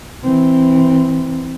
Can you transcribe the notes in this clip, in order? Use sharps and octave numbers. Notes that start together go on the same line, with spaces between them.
E3 C4